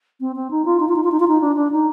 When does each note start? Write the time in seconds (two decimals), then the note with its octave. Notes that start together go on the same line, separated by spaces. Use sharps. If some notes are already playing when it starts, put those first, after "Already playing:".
0.20 C4
0.36 C4
0.51 D#4
0.65 F4
0.80 D#4
0.89 F4
0.96 D#4
1.04 F4
1.12 D#4
1.20 F4
1.28 D#4
1.41 D4
1.56 D4
1.71 D#4